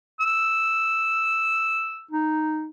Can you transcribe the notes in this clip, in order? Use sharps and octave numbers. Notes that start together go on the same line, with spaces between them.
E6
D#4